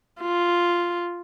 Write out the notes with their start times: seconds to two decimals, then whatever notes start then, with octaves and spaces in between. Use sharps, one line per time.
0.22 F4